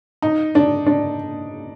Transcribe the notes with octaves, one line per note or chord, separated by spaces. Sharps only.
D#4
D4
D4